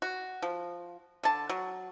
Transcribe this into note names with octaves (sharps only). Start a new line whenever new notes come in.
F#4
F3
D3 A5
F#3